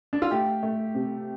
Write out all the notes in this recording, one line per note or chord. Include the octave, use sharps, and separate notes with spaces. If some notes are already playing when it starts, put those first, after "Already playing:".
D4
F4
A3 G4
A3
C3